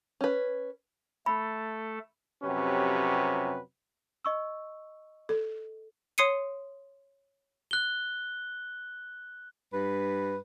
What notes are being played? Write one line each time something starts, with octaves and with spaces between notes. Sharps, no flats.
C#4 B4
A3 A4 B5
F2 C3 F#3 C#4 G4 B4
D#5 C#6 E6
A4
C#5 C6 D#6 C7 C#7 D#7
F#6 G7
G2 B4